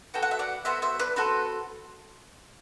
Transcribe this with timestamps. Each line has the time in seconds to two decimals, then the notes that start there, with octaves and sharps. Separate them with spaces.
0.14 B3 F#4 A4 G5
0.23 F#5
0.31 E5
0.39 D5 F#5
0.65 B3 F#4 A4 C5 E5
0.82 C5 E5
0.99 B4 D5
1.16 C4 F#4 A4 B4